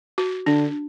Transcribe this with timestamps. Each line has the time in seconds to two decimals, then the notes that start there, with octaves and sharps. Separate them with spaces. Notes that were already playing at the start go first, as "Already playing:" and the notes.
0.18 F#4
0.46 D3 D4